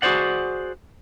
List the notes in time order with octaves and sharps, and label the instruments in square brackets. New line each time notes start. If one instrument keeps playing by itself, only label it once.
[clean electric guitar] F#4 G#4 A#4 C5 D5 F#5